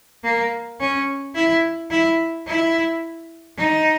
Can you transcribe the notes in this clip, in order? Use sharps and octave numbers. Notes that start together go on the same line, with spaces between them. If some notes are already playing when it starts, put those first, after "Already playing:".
A#3
C#4
E4
E4
E4
D#4